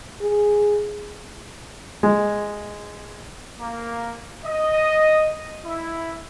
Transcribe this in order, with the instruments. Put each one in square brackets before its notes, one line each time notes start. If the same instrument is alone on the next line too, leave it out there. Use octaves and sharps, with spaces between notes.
[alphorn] G#4
[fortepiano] G#3
[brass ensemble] A#3
D#5
E4